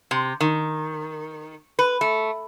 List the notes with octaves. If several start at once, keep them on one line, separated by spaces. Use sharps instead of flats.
C3
D#3
B4
A3